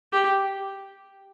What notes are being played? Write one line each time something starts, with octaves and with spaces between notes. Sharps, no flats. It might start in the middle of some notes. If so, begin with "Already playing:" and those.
G4